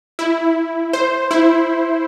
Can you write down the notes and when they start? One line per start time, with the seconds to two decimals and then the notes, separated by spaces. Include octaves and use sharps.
0.19 E4
0.93 C5
1.31 E4